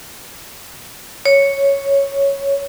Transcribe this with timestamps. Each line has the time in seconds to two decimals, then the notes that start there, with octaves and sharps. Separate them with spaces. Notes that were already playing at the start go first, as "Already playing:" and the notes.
1.25 C#5